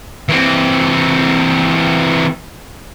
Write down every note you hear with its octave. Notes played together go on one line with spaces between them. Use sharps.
E3 C4